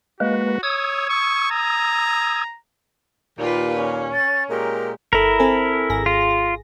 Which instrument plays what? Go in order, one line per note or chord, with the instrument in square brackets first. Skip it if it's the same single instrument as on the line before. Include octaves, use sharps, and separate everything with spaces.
[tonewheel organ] G#3 A#3 B4 [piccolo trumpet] F#4
[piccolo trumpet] C#5 [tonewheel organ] D#6 E6 G#6
[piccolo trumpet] C#6
A#5
[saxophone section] D#2 A#2 [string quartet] F4 G4 B4
[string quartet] C#4
[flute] A6
[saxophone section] A#2 G#3 G4 [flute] A#4
[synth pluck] G1 A4 [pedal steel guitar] E4 A#4
[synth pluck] C4 A4 G#5
G#1 G#4 A#6
[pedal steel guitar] F4